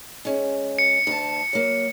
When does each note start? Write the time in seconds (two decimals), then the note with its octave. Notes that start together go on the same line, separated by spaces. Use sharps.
0.25 G#3 C#4
0.79 C#7
1.07 D2 A5
1.53 F#3 A#3